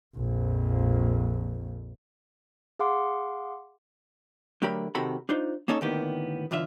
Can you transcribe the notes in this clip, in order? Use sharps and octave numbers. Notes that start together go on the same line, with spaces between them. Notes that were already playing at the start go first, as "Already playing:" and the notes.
A#1 F2
G#4 F5 F#5 C6 D6
D3 F#3 A3 G4 A#4 B5
C3 D#3 F#4 A4 A#5 B5
D4 D#4 F4 C5
A#3 C#4 D#4 A4 C#5
D2 A2 D#3 A#3 B3 G4
B1 E2 D3 F4 E5